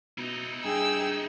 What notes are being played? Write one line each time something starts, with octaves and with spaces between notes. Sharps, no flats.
B2 D#4 E4
G2 G#4 G5 E6